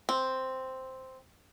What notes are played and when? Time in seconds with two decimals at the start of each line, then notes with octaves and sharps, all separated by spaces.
0.09 C4